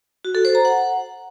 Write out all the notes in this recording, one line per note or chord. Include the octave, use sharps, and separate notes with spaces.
F#4
A4
C5
A#5
F#5